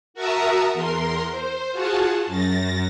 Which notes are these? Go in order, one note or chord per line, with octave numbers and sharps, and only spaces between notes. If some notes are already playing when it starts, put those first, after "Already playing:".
F#4 A#4 E5 A5 A#5 D#6
E2 A#4 C6
C5
F4 F#4 G#4 A5
F#2 A6 A#6